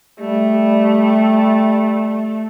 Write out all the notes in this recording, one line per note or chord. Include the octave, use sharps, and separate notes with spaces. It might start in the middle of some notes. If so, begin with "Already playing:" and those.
G3 A3